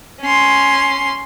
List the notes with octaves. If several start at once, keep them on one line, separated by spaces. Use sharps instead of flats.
C#4 C6